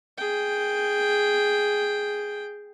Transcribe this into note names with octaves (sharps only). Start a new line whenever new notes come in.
G#4 G5